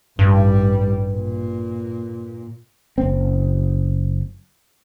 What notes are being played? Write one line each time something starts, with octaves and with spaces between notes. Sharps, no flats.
A1 G2 G3
A#2
F#1 C4